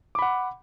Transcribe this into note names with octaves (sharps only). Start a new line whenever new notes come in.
F#5 B5 D6